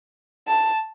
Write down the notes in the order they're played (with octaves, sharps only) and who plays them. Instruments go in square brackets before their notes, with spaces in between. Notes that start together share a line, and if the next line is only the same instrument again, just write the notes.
[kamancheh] A5